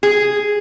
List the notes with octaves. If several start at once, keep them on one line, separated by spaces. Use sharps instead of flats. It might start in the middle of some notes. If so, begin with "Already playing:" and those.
G#4